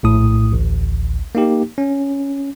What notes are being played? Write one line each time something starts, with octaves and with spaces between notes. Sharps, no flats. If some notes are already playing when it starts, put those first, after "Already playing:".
A#1 A2 D#6
A1 D2
A#3 D#4 G4
C#4